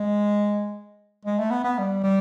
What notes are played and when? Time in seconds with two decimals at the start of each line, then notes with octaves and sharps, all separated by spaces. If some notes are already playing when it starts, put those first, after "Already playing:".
Already playing: G#3
1.25 G#3
1.39 A3
1.51 B3
1.64 B3
1.78 G3
2.04 G3